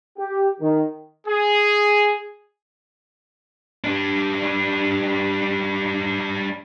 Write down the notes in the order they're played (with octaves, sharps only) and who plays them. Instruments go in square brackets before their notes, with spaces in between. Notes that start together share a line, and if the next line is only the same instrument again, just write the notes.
[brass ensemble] G4
D#3
[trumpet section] G#4
[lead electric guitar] G3 D4